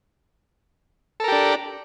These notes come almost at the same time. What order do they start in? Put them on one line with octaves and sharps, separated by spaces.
A4 A#4 G4 D4